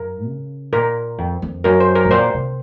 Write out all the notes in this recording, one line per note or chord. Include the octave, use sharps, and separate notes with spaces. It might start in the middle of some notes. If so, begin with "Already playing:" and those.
Already playing: F#2 A#4
C#3
A#2 A#4
F2
F2
F#2 A#4
C5
A#4
A2
A#2 C5
C3